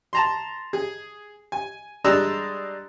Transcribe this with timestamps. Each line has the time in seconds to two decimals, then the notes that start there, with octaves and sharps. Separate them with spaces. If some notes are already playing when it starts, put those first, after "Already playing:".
0.13 A5 A#5 C6
0.73 G#4
1.52 G#5
2.04 G3 G#3 D4 A#5 E6 F#6